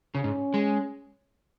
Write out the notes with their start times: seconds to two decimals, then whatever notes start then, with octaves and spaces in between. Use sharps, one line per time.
0.15 C#3 C#4
0.24 G#2
0.54 G#3